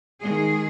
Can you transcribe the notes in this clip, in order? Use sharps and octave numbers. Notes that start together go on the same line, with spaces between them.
D#3 G#3 G#4